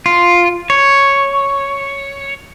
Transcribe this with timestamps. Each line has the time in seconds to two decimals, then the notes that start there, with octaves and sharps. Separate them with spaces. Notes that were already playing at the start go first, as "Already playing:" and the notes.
0.06 F4
0.70 C#5